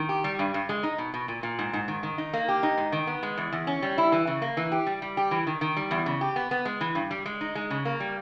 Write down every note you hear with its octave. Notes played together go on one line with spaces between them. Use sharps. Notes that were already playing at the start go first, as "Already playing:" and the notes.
Already playing: D#3
G4
G3
G2
G2
G#3
D#4
B2
B2
A#2
A#2
G#2
G#2
D#3
D#3
D#4
A#3
G4
D#4
G#2
D#3
B3
G#3
E2
E2
C#4
G3
E4
E3
C#3
A#3
E3
G4
G3
G3
G4
E3
D#3
D#3
G3
E2
C#3
G4
B3
B3
G#3
E3
G2
G3
G#3
D#4
G#3
C#3
A#3
G3